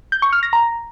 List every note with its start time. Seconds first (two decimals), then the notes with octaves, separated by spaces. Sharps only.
0.12 G6
0.22 C#6
0.33 F6
0.43 A#6
0.53 A#5